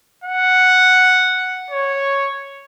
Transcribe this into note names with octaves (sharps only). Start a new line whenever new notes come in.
F#5
C#5